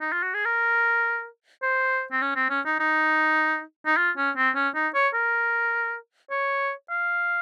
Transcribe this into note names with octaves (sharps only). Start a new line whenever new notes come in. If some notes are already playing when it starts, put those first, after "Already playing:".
D#4
F4
F#4
G#4
A#4
C5
C4
C#4
C4
C#4
D#4
D#4
D#4
F4
C#4
C4
C#4
D#4
C#5
A#4
C#5
F5